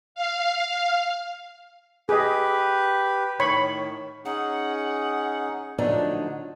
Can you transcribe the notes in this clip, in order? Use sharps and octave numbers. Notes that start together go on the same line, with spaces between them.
F5
G4 G#4 B4 D#5
A2 D#3 C#5 B5 C#6
C#4 D#4 G#4 F#5
D3 F3 F#3 A3 D4 D#4